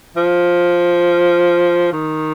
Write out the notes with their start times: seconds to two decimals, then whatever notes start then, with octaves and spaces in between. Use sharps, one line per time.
0.16 F3
1.92 D#3